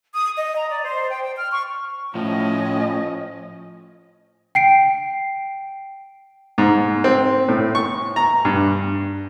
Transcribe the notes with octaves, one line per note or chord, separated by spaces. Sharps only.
D#6
D#5
A#5
D5
C5
G5
G5
F6
C#6
A2 F3 C#4 D#5
G5 C7 D7
G#2
C4
A2
C#6
A#5
G2